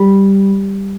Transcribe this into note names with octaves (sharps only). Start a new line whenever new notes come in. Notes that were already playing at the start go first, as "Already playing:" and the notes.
Already playing: G3